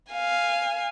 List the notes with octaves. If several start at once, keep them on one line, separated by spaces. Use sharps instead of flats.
F5 G#5